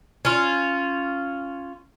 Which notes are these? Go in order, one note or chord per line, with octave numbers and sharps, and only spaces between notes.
C#4 F4